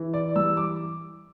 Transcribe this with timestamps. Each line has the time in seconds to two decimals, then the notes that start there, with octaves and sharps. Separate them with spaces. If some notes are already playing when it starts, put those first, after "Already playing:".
Already playing: E3
0.14 D5
0.36 G3 E6
0.57 D6